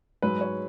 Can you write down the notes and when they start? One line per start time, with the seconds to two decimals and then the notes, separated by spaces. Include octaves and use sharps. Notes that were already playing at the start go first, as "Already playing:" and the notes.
0.22 G#2 F#3 B4
0.41 C#5